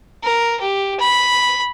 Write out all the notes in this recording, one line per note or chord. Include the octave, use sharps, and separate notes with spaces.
A#4
G4
B5